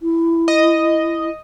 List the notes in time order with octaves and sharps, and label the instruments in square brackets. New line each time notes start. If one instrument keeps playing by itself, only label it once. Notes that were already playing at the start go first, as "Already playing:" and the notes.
[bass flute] E4
[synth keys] D#5